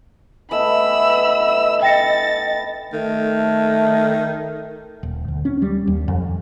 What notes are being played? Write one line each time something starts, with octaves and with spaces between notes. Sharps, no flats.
E3 A3 B3 D#5 B5 E6
G5 A6 A#6 C#7
D#3 A3
D#1
D2
C#4
G3
D#2
F2